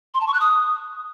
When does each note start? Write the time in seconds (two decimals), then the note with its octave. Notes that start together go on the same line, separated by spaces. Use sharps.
0.14 C6
0.21 A5
0.27 C#6
0.34 F#6
0.40 D#6